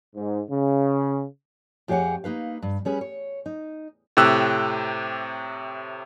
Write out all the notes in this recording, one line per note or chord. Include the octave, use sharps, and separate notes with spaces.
G#2
C#3
F2 G4 G#4 C#5 F#5 G#5
A#3 D#4 B4 F5
G2
G3 C#4 G#4 B4
C#5
D#4
A2 C3 G4 E6 F#6